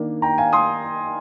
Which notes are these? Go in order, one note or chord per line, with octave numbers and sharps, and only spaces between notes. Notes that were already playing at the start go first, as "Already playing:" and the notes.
Already playing: D#3 A#3 D4
G5 A#5
F5 G#5
C6 D#6